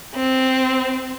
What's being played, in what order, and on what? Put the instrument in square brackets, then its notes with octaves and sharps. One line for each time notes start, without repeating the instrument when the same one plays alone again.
[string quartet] C4